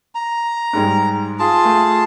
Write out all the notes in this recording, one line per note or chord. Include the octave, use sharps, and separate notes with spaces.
A#5
G#2 G3 G#3
F4 G#4 A5
A3